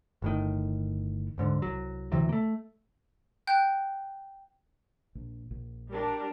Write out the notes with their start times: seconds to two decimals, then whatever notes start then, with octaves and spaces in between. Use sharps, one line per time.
0.22 G1 A2 D#3
1.38 D1 G#2 D3
1.62 C2 F#3
2.12 D2 C3 E3 F#3
2.29 A3 A#3
3.47 G5 F#6 G6
5.15 A#1
5.51 A#1
5.91 G3 D4 A#4